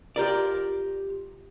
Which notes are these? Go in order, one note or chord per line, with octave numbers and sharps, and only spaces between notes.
F4 G4 A#4 D5